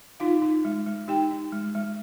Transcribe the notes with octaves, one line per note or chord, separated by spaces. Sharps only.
D#4 F4 F5
D#4
G#3
G#3
D#4 G4 G5
D#4
G#3
G#3